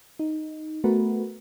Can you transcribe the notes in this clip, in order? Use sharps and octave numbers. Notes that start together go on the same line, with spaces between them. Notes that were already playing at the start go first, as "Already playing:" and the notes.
D#4
A3 B3 F#4 A#4 B4